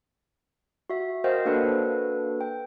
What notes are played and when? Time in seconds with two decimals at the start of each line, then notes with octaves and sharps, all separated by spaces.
0.90 F#4 E5
1.24 F#4 A#4 C5 D#5 F5 G5
1.45 A#3 D4 F#4 A4 B4
2.41 G5